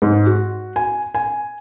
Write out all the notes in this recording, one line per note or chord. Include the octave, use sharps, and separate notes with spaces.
G#2
F#4
G#5
G#5